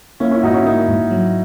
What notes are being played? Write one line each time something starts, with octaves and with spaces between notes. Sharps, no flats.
A#3 C#4 E4
C#4 E4
G#2 D#4 F#4
C#4 E4
A#3 D#4
G#2
F#3